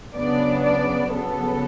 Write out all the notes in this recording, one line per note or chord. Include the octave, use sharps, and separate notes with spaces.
C#3 F#3 B3 D4 D5
D5
C#3 F#3 B3 A4